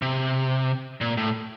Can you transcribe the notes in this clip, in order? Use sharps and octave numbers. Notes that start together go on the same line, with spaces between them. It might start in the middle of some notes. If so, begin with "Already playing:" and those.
C3
A#2
A2